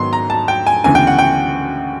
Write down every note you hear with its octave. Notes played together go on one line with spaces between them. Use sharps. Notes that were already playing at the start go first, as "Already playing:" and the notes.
Already playing: G#2 D#3 F#3 B3 C6
A#5
A5
G5
G#5
D2 C#3 E3 G#3 B3 G#5
G5
F#5
G5